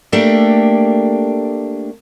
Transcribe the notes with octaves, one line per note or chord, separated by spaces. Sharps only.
A3 A#3 D4 G4